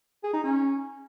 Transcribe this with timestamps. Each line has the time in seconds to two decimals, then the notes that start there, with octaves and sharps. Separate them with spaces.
0.24 G#4
0.34 D#4
0.44 C#4